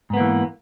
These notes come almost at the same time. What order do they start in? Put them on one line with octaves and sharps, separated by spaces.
G#2 B3 A#3 E3